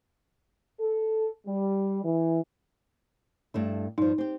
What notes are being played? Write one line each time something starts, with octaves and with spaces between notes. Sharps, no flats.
A4
G3
E3
G2 A3 E4
G2 F3 D#4
C4 G4